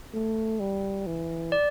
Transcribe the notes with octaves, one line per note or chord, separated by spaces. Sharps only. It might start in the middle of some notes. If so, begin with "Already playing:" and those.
A3
G3
E3
D5